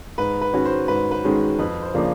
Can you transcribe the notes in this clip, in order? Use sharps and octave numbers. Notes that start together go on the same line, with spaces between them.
G#2 B4
B4
D#3 G#3 C#4 F#4
C5
G#2 B4
B4
D#3 G#3 C#4 F#4
F2 B4
C5
C#3 F3 A#3 D4